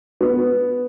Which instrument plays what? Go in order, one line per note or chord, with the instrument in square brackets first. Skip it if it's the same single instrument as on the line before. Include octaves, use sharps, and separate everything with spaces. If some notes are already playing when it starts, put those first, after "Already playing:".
[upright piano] B3